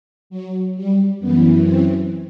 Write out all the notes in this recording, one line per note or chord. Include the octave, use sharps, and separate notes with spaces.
F#3
G3
F#2 E3 B3
C4